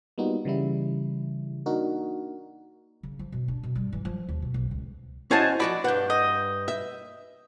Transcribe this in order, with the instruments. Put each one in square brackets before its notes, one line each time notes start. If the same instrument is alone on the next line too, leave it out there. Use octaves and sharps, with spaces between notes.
[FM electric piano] G3 A#3 B3 D#4 F4 F#4
C#3 E3 G3 E4
A#3 D4 D#4 F#4 A#4
[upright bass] C#3
F3
B2
D4
B2
G2
E3
F3
D#2
B2
B1
C#2
[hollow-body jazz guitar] C#4 F#4 [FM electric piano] E4 D#5 [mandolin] C5 G#5 A5
[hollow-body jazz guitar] F3 F#4 B5 [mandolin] D4
[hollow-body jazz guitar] G2 F#5 [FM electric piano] B4 G6
[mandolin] D#5
[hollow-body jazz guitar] E5